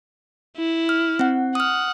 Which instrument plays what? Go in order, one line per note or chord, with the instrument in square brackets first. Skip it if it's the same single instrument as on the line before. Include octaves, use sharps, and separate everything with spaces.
[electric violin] E4
[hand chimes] F6
C4 F#5
[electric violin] F#5 [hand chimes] D#6 F6